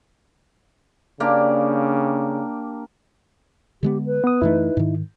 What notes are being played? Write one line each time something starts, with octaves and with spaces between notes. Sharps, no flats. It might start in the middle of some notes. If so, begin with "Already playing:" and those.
C#3 A#3 D4 G4
D3 G#3 B3 G4
B4
B3 D#6
F#2 E3 A3 D#4 E4
G#2 D#3